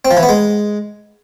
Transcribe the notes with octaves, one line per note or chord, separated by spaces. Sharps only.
C4
F3
E3
B3
G#3